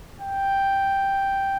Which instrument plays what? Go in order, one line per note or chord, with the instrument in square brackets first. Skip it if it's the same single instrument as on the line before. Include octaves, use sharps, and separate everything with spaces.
[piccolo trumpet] G5